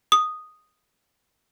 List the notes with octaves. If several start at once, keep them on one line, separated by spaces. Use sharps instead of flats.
D#6